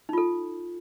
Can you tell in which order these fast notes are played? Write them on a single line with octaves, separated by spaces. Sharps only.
D#4 F4 A4